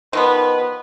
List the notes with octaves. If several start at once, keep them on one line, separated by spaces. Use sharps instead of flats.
D#3 F3 B3 B4